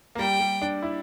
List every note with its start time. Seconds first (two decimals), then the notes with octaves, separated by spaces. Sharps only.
0.15 A#3
0.19 G3 G5
0.40 G3
0.62 D4
0.82 E4